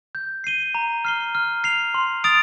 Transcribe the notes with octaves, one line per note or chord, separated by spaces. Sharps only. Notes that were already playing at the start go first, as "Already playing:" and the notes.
G6
C7 D#7 G7
A#5
F6 C7 G7
F6
C7 F7
C6
D#6 A6 D7 F7